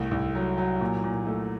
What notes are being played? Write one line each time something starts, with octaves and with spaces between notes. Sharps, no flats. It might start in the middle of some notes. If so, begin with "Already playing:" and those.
Already playing: C2 A3
C2
F#3
F#3
A#2
A#2
A3